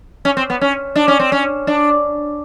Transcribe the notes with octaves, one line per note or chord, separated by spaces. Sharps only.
C#4
C4
B3
C#4
D4
C#4
C4
C#4
D4